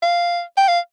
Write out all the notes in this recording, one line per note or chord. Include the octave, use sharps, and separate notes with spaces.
F5
G5
F5